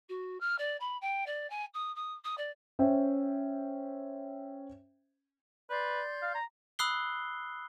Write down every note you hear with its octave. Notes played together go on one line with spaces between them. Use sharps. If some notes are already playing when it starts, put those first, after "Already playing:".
F#4
F6
D5
B5
G5
D5
G#5
D#6
D#6
D#6
D5
C#4 C5 E5 G5
B4 D5 C6 G6
F5
A#5
B5 D#6 E6 F#6 C7 G7